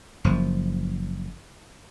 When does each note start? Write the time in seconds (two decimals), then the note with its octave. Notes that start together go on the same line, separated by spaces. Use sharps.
0.24 F#1 F3